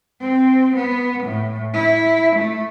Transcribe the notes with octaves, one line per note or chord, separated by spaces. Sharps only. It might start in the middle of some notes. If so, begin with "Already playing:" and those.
C4
B3
A2
E4
A3